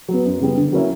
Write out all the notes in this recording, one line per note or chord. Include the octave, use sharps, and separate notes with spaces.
F#3 B3
F#2
C#3 G3 B3
D3
F#3 A#3 C#4 E4